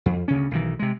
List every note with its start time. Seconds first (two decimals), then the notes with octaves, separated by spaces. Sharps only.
0.06 F2
0.28 D2 C#3 C#4
0.51 B1 D#3 E3
0.79 C3 G#3